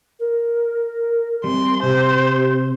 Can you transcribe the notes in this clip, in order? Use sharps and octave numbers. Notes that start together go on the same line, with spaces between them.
A#4
G3 C4 C6
C3 G4 C5